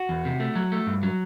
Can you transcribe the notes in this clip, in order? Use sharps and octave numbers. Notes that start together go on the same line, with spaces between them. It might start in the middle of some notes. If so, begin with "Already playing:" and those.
Already playing: F#4
E2
C3
A3
F#3
A3
G2
F#3